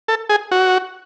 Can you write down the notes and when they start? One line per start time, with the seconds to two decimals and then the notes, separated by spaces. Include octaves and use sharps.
0.08 A4
0.29 G#4
0.51 F#4